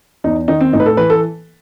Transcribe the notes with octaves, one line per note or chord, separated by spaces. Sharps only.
E2 D#4
D#3 D#4
C4
A2 D#4
B4
A4
E3 B4
A4